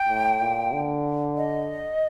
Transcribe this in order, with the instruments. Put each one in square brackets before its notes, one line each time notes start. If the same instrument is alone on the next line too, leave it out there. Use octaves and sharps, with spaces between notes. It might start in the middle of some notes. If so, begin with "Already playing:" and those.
Already playing: [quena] G5
[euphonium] A2
A#2
D3
[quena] D#5